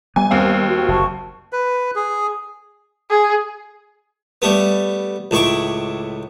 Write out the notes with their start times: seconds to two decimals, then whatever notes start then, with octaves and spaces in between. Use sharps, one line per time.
0.16 G3 B3 G#5
0.31 D#2 C4 F5
0.68 F#4
0.88 F#1 A5 C#6
1.52 B4
1.96 G#4
3.10 G#4
4.42 G3 A3 B3
5.31 C#2 A2 E4 C#6 D6